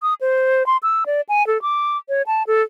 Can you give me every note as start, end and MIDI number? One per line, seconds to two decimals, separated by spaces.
0.02 0.14 87
0.21 0.66 72
0.66 0.77 84
0.83 1.04 88
1.06 1.21 74
1.29 1.46 80
1.47 1.61 69
1.62 1.97 86
2.09 2.22 73
2.27 2.43 81
2.47 2.62 69